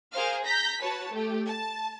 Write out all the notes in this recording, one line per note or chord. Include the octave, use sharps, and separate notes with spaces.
G#4 A#4 C5 F5 F6
A#5 G6 A#6 B6
F#4 B4 C#5 A5
A3 G4
A5